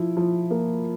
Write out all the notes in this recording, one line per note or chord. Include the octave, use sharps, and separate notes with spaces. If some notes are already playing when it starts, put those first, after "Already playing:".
Already playing: F3 E4
F3
A#3